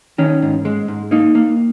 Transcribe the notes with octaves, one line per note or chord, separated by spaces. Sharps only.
D#3 C#4
G#2
G#3
G#2
A#3 D#4
A#3